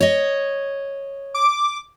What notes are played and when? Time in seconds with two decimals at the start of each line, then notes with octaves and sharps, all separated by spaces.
0.01 C#5 D#5
1.34 D6